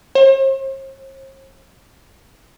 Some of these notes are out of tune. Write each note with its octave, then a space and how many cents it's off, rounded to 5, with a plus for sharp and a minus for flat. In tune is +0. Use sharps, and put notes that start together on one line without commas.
C5 +45